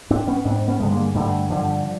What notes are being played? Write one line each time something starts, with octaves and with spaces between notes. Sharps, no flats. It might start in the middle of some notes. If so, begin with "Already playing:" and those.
G#2 C4 D4
B3 C#4
G#2 C4 D4
B3 C#4
G2 D3 A3 B3
G#3 A#3
G2 D3 G3 A3
G2 D3 F3 G3